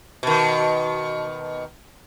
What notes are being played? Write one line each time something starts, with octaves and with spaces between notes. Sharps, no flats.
B2 D#3